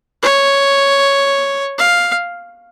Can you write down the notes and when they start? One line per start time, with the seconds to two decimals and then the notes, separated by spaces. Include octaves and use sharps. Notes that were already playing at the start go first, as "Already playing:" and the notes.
0.23 C#5
1.78 F5